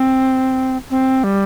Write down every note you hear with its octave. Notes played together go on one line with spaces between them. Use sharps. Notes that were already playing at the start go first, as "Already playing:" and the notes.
Already playing: C4
C4
G3